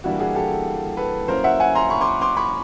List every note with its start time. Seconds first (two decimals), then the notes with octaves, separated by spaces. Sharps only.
0.04 E3 G3 A#3 D4 E4 F#4
0.20 F#4 G#4
0.35 G4 A4
0.97 A4 B4
1.28 F#3 A#3 C#4 E4 A#4 C5
1.44 E5 F#5
1.60 F#5 G#5
1.75 A#5 C6
1.90 B5 C#6
2.01 C6 D6
2.21 C6 D6
2.37 B5 C#6